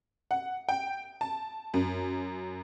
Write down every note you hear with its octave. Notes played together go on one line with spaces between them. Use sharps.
F#5
G5
A5
F#2